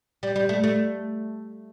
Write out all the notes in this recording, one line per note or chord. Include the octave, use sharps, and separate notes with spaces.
G3
G3
A3
A3